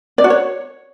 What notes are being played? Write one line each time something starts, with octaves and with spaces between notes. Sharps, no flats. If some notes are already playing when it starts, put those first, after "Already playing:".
D5
F#4
C#5